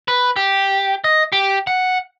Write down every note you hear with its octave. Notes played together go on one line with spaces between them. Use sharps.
B4
G4
D#5
G4
F#5